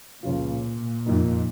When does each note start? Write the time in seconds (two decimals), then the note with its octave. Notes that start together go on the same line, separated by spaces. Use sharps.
0.23 C#2 A#2 C#3 F3 C#4 F4
1.06 F2 F3 A#3 D#4